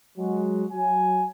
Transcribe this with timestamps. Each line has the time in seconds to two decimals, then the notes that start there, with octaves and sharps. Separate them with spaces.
0.18 F#3 G#3 F#4
0.72 F#3 G#5